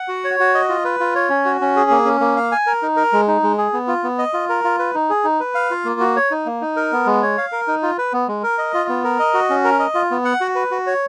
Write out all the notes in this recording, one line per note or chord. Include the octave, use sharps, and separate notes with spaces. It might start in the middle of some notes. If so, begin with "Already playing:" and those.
Already playing: F#5
F#4
C#5
F#4
D#5
F4
B4
F4
C#5
C#4
F#4
C#4
G#4
A#3
C#4
A#3
F5
G#5
A#4
D#4
A#4
G#3
D#4
G#3
G#4
B3
F4
B3
D#5
F4
A#4
F4
B4
D#4
G#4
D#4
B4
F5
F4
A#3
F#4
C#5
D#4
A#3
D#4
A#4
B3
G#3
C#5
F5
A#4
D#4
F4
B4
B3
G#3
A#4
D#5
F4
B3
A#4
D#5
F#4
C#4
A#4
D#5
F4
B3
F#5
F#4
B4
F#4
C#5